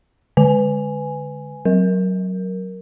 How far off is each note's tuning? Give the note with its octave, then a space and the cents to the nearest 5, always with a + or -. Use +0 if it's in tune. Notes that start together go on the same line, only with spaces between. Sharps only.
D3 -5 G#5 +0
F#3 +10 A#4 +0